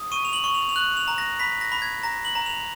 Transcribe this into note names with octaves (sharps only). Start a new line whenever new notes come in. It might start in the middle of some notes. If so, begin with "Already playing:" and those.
Already playing: D#6
C#6 D#7
F7
F#7
C#6
F7
F7
F#6 F#7
F7
A#5
A#6
B5 B6
A#6
B5
G#6
A#5 A#6
F#7
A#5
F7